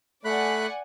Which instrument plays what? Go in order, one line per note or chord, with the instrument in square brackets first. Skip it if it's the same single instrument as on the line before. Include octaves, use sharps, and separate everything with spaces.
[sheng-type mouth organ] A3 B5 F#6 [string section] D5 F#5 G#5